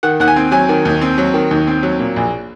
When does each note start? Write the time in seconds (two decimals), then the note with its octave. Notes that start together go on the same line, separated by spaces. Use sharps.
0.03 D#3 F#5
0.20 D#2 F#5
0.28 G#5
0.36 C4
0.52 F#3 G#5
0.69 D#3
0.85 D#2
1.01 C4
1.18 F#3
1.34 D#3
1.51 D#2
1.67 C4
1.83 F#3
1.99 A#2
2.16 A#1